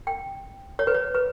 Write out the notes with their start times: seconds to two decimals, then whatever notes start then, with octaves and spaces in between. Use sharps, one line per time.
0.07 G5
0.79 C#5
0.87 B4
0.95 C#5
1.14 B4